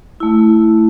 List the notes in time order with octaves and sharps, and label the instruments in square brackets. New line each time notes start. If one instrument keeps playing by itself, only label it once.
[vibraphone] A3 E4